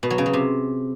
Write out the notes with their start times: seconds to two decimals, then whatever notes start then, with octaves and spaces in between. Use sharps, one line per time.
0.03 B2
0.10 F#3
0.18 C#3
0.26 F#3
0.33 C3